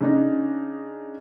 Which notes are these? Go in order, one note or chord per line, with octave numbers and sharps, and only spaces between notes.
C#3 D4 D#4